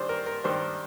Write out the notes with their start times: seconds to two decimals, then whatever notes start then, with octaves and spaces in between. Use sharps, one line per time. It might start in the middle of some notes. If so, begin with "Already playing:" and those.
Already playing: G2 D#3 G3 C5 D5
0.09 A#4
0.26 A#4
0.44 G2 D#3 G3 C5